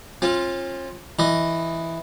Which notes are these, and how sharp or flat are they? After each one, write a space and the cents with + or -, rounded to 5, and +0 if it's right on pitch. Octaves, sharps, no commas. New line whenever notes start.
C#4 -45 F4 +0
E3 +0 D#5 +0